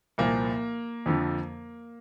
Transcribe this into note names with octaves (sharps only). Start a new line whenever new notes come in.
C2 A#2 F3 A#3
F2 D3 F3